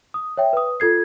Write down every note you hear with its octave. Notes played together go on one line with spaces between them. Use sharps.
D#6
C#5 E5 G5
B4 D#6
F4 A4 G#6 C7